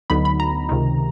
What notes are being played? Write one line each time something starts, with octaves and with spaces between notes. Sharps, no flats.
D2 D3 F#3 B3 D#4 B5
B5
A#5
C#2 C3 D#3